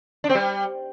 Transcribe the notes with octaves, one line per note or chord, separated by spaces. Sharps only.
D4
C4
G3